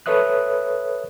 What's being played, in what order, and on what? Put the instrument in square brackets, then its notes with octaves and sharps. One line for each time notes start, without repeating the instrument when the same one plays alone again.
[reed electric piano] A4 B4 C#5 E5 D#6 F#6